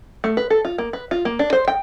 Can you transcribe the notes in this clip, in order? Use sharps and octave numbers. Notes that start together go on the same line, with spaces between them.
A3
B4
A4
F4
A#3
B4
F4
A#3
D4
C5
G5